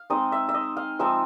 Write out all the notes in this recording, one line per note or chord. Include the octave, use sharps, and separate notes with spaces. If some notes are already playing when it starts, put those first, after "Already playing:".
Already playing: F5
G#3 C4 D#4 D#5
E5
E5
D#5
F5
F3 G#3 C4 D#4 E5